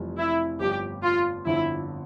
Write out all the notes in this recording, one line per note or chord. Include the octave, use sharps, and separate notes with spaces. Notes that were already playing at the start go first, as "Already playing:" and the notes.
Already playing: F1 F2 E3 G3
E4
G1 G2 F3 G4
F4
G1 F2 D3 F3 E4